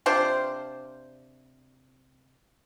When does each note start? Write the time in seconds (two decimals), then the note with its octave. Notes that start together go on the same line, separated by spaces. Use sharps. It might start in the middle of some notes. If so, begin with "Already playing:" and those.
0.06 C3 D4 F4 C5